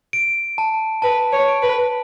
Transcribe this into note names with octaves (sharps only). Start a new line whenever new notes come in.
D7
A5
B4 A5
C#5
D7
B4